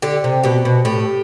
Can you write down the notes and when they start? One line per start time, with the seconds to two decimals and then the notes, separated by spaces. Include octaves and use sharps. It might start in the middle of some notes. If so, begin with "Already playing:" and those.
0.02 D3 G4
0.24 C3
0.43 B2 G4
0.65 B2
0.85 A2 G4